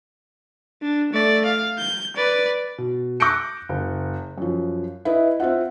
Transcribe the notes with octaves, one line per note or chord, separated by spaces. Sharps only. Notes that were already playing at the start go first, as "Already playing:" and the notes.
D4
A3 D5
F5
G6
B4 D5
B2
D6 F#6 G6 A#6 C#7 D7
F#1
F#2 F3
E4 B4 D#5
C4 F4 E5 F#5